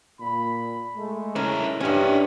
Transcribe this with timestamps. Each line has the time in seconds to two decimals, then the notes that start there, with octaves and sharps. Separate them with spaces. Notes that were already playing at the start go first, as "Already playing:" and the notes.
0.21 A#2 B5
0.97 G#3 A3
1.36 C#4 E4 A#4
1.81 G2 C#4 D4 G4 C#5 E5